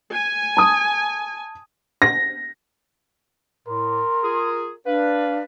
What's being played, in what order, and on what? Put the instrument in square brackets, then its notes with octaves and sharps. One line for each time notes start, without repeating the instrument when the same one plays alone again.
[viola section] G#5
[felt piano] A5 D#6
[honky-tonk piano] A#6
[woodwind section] A2 [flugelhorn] A#4 [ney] C6
[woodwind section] F4 G#4
[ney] D4 [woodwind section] B4 [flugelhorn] F5